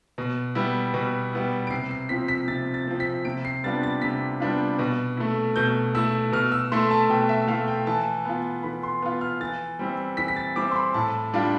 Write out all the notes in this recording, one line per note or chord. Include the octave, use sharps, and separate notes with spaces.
B2
G3 B3 E4
B2
G3 B3 E4
D7
C3 C7
C7
F3 C4 B6
B6
C3 A6
A6
F3 C4
B6
C3 D7
C7
G3 B3 D4 F4 A6
A6
C3 B6
G3 B3 D4 F4
B2
A3 E4
B2 G6
A3 E4 E6
B2 F6
E6
A3 E4 C6
A5
B2 G5
E5
A3 E4 F5
G5
E3 A5
B3 F4
E3 B5
C6
B3 F4
F6
E3 A6
G3 C4 E4
E3 B6
B6
A6
G3 C4 E4 D6
C6
B5
A2 A5
G3 D4 F4